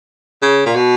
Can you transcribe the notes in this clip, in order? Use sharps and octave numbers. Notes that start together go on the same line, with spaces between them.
C#3
A#2
B2